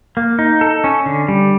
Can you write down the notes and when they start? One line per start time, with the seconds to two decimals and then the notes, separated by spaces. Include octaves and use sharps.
0.17 A#3
0.39 D#4
0.61 A4
0.84 C#4
1.06 D3
1.28 G3